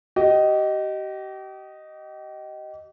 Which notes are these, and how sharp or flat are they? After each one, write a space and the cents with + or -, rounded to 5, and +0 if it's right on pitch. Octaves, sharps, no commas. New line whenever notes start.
G4 -35 D#5 +0